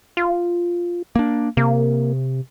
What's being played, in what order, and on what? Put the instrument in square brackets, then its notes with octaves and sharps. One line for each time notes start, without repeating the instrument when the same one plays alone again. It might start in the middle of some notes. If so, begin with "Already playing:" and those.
[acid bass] F4
[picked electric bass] A#3 D4
[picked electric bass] C3 [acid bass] A#3